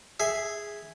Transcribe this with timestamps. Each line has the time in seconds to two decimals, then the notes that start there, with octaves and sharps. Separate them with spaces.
0.20 G#4 E5